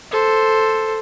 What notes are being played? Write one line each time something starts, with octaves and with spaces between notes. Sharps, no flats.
A4 C5